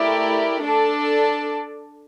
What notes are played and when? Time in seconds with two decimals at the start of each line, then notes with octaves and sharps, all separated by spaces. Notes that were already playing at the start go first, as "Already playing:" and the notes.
Already playing: A3 E4 G4 A#4 D5
0.63 D4 A4 D5 A5